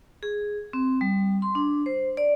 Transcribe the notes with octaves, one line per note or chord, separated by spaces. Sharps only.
G#4
C4
G3
C6
D4
C5
D5